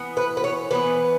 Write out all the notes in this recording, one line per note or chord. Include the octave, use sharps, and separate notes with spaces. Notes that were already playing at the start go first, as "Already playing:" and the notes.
Already playing: E3 B3
B4
B4
C#5
E3 B3 B4